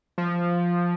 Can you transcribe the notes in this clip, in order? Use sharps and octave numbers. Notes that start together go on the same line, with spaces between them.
F3